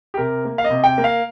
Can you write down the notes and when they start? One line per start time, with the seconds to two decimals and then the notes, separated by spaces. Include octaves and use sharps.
0.14 G4
0.17 C3 A#4
0.45 A#3
0.58 F5
0.64 D#5
0.70 C3
0.84 G5
0.98 A#3
1.04 F5